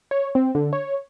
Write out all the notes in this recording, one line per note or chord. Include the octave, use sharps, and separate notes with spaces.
C#5
C4
D3
C#5